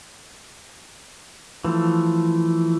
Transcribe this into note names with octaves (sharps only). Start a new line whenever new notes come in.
E3 F3 A3